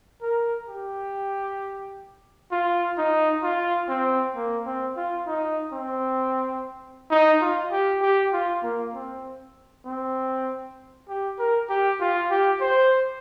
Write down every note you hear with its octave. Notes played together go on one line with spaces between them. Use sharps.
A#4
G4
F4
D#4
F4
C4
A#3
C4
F4
D#4
C4
D#4
F4
G4
G4
F4
A#3
C4
C4
G4
A#4
G4
F4
G4
C5